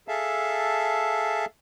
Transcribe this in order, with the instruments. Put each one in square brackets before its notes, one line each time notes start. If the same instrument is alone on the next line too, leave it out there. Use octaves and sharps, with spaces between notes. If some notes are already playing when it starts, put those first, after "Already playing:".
[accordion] G#4 A4 E5 F5 A5